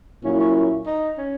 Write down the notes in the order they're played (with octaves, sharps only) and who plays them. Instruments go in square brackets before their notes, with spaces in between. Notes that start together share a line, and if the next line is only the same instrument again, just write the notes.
[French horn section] A#2 F#3 A#3 E4 [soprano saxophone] C#4
[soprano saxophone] C#4
C#4
D#4
C#4